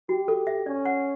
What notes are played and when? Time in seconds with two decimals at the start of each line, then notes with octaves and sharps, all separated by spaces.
0.09 F#4 G4
0.28 A4
0.47 E5
0.66 C#4 D5
0.85 F#5